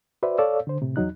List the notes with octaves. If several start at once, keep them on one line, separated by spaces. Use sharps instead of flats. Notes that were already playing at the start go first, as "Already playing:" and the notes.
F#4 B4 C5 D5 E5
A4 C#5 D5 F5 E6
D3 C5
A2 C3
E2 F#3 D#4 F#6